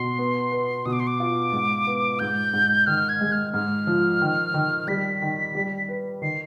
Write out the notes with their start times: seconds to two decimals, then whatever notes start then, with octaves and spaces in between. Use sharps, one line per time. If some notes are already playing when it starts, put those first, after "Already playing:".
Already playing: B2 C6
0.19 B3
0.52 B4
0.86 B2 D#6
0.93 D6
1.00 C6
1.07 D6
1.20 F4
1.52 G#2
1.87 B3
2.19 G#2 G6
2.53 G#2
2.87 D#3 F6
3.09 G#6
3.21 G#3
3.32 F6
3.54 G#2 F6
3.87 F3
4.22 D#3
4.54 D#3
4.88 G3 B6
5.22 D#3
5.55 G3
5.89 B4
6.22 D#3 C7